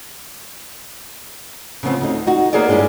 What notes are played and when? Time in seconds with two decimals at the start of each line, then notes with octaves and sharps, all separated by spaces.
1.83 C#3 F3 B3 C4
2.01 D2 D#4
2.27 D#4 F#4
2.53 A#3 B3 G#4 C#5 D5
2.68 G2 G#3 D4 E4